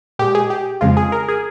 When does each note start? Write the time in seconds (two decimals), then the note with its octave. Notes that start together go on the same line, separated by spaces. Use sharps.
0.19 A#2 G#3 G4
0.35 G#4
0.50 G4
0.81 F2 C#3 F3 G#3 F4
0.97 G#4
1.12 A#4
1.28 G#4